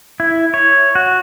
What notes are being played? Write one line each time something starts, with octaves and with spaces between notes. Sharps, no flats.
E4
C#5
F#4